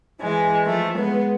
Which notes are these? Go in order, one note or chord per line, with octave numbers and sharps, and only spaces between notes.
E3 G#3
F3 A3
G#3 B3